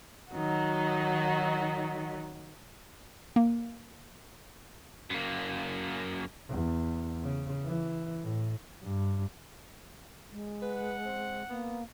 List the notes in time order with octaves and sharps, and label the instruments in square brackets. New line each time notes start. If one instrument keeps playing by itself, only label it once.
[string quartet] D#3 F#3 D#4 F#4
[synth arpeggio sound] A#3
[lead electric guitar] F#2 A#3
[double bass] E2
C#3
E3
A2
G2
[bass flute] G#3
[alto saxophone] B4 [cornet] F#5
[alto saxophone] C4
[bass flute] A#3 [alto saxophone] B3